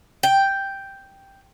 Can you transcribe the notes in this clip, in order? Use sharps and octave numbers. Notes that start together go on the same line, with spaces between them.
G5